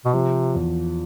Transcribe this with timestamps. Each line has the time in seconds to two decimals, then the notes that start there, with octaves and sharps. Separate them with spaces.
0.05 B2
0.13 C3 F3
0.55 E2